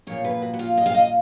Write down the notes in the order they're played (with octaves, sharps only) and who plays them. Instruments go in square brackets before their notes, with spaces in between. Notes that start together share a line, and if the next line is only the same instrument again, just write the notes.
[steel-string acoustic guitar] A#2 F3 A#3 C#5
B4
F#4
F#4
F4
D#5
F5
D#5